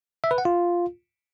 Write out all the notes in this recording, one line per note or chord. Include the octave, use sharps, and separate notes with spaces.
E5
B4
F#5
F4